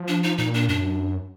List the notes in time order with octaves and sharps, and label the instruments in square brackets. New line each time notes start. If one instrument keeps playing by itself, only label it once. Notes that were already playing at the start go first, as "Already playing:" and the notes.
Already playing: [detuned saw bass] F3
[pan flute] D4
D#4
[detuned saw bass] A#2 [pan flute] D#4
[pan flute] D4
[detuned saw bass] F#2 [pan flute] D4